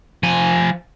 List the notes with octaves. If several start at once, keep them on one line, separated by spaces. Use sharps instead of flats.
F3 G#5